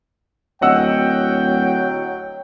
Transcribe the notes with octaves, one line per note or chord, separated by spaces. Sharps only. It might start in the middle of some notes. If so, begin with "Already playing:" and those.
D1 F#3 D#5 F#5 G5 E6